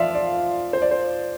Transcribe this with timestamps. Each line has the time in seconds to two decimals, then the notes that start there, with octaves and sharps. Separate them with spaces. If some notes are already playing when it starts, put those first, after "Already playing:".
Already playing: F3 F4 D5 E5 F5
0.15 D5
0.73 C5
0.82 D5
0.91 C5